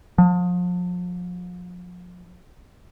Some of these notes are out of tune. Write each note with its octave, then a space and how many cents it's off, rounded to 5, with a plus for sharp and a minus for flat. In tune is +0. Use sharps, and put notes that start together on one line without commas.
F3 +35